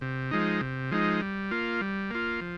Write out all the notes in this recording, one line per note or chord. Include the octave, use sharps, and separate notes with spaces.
C3
F3 G#3 D#4
C3
F3 G#3 D#4
G3
A#3 F4
G3
A#3 F4
F3